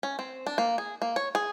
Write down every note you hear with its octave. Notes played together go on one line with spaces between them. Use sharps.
C#4
C4
D4
A#3
G#4
A#3
C#5
G#4